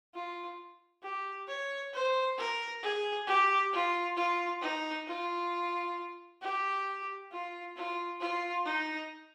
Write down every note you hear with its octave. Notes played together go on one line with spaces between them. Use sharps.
F4
G4
C#5
C5
A#4
G#4
G4
F4
F4
D#4
F4
G4
F4
F4
F4
D#4